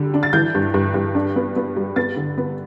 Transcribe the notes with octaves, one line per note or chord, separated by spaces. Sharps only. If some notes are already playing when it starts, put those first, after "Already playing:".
Already playing: D3 G3
D4
A6
E3 G6
G2
G2
G2
D4
B3
B3
G3
B3 A6
D3
B3